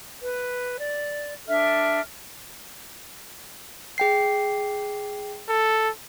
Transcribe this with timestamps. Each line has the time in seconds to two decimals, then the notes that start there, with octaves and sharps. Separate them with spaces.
0.23 B4
0.80 D5
1.48 D4 A4 E5 F6
3.98 G#4 G5 C7
5.49 A4